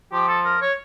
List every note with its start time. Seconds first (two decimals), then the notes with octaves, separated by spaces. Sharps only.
0.13 F3 G4
0.28 A4
0.45 A#4
0.62 C#5